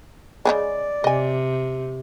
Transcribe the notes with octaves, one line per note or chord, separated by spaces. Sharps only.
C#3 E3 G#3 D5
C3 D#5 G#5